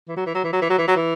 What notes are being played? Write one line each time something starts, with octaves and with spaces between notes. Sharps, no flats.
E3
F#3
E3
F#3
E3
F#3
E3
F#3
E3
F#3
E3